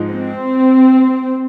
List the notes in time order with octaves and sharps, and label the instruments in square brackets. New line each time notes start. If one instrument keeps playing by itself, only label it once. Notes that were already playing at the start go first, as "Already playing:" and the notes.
Already playing: [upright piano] G#2 F3 G#3 D#4 G#4
[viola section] C4